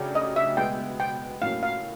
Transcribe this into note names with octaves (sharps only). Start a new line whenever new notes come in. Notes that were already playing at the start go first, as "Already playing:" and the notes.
Already playing: C#3 F#3 A3 D4 G4
D#5
E5
B2 G#3 B3 G5
G5
A2 F#3 A#3 C#4 F5
F5